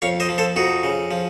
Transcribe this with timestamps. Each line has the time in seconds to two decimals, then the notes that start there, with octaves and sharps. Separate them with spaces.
0.02 F2 C#5 F5
0.20 C5 D#5
0.29 F3
0.38 A4 C5
0.56 F2 D#4 F#4
0.84 C#3
1.11 F3